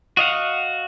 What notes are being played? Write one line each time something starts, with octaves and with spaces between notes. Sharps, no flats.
F#4 D#5 F5 F#5